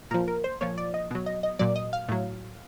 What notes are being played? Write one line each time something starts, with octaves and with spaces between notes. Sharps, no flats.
A#2 F3 A#4
A#4
C5
A#2 F3 C#5
D5
D#5
B2 F#3
D#5
D#5
A#2 F#3 D5
D#5
F5
A2 F#3